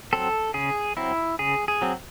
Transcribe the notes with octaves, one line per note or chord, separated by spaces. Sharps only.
F#3 C4 A4
C#3 G#4
F#3 C4 E4
C#3 G#4
G#4
F#3 C4